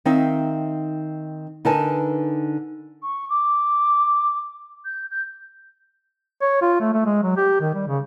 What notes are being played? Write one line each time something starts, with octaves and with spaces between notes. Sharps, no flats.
D#3 C4 D#4 E5 F5
D3 D#4 A#4 B4 G#5 A5
C#6
D6
G6
G6
C#5
F4
A3
A3
G#3
F#3
G4
D#3
G3
C#3